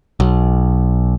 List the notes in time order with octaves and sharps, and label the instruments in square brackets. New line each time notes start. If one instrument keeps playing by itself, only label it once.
[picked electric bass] B1